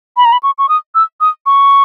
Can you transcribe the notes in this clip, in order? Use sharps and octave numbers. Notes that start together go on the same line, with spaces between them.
B5
A#5
B5
C#6
C#6
D#6
E6
D#6
C#6